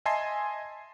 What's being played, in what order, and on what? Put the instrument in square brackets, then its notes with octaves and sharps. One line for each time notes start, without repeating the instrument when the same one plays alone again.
[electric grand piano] D#5 E5 G#5 A5 C6 C7